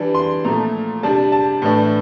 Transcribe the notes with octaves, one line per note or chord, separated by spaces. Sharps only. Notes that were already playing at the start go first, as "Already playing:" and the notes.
Already playing: E3 G3 D4
C6
A#2 F3 A3 A#5
C3 G3 D4 A5
A5
A2 E3 A3 D4